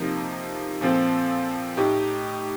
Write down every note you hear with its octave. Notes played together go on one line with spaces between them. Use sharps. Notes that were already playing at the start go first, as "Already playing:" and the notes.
Already playing: C3 F3 A#3 D#4
A#2 F3 C4 F4 A4
A2 A3 D#4 G4